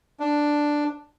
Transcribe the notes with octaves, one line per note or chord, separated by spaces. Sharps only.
D4